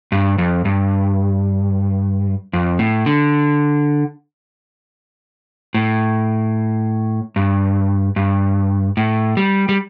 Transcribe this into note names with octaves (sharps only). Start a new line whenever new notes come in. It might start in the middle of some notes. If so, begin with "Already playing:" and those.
G2
F2
G2
F2
A2
D3
A2
G2
G2
A2
G3
G3